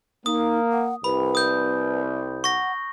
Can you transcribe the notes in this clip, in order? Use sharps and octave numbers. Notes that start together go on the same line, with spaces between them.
A#3 D#4 D#6
F#5
C2 B4 B5
D#6 G6
F#5 C#6 A#6